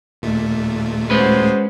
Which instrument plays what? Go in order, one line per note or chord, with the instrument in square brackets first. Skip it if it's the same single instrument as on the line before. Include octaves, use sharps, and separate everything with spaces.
[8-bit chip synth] D#2 A#2 A3
[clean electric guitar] G#3 C#4 B4 [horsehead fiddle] F#4 C5